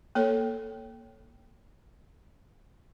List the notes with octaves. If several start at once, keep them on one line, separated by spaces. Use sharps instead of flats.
A#3 A4 C#5